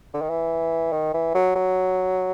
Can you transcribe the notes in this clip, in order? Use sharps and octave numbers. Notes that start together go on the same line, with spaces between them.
D3
D#3
E3
D#3
E3
F#3
F#3